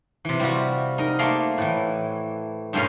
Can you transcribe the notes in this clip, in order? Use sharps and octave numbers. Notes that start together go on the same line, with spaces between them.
C3 E3
G3 F4 F#4
D#4 A#4
A3 A#3 D5 C6
A2 E3
G2 A#2 G3 A#3 C#4 F5